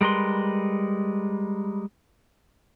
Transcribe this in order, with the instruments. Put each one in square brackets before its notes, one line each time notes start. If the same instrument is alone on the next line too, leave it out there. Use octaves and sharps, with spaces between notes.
[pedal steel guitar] G3 G#3 A#4 B4 C6